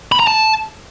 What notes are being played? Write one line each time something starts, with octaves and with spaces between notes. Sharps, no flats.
B5
A#5
A5